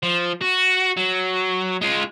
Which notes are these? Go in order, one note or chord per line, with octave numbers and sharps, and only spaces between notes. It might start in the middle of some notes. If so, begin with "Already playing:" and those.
F3
F#4
F#3
G#3 F4